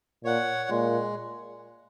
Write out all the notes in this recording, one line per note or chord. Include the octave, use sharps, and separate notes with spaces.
A#2 C#5 F#5
A#2 G#3